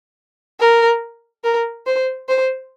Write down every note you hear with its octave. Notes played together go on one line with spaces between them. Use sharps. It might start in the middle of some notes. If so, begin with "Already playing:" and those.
A#4
A#4
C5
C5